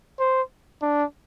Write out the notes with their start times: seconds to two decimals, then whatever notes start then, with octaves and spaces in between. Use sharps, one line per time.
0.19 C5
0.82 D4